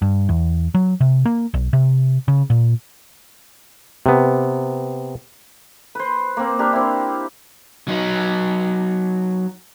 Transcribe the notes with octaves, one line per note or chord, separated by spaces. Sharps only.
G2
E2
F#3
C3
A#3
B1
C3
C#3
A#2
C3 B3
B4 C5
A#3 C4
D4 G4 A#4
C4 E4
F#3 D#4